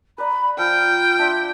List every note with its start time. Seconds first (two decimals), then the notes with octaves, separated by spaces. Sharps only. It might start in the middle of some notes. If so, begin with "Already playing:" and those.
0.18 B4 D5 A#5 B5
0.58 F3 G5 F6
1.19 D4 E5 C6